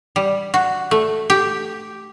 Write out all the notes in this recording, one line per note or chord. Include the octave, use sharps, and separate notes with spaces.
G3
F#4
A3
G4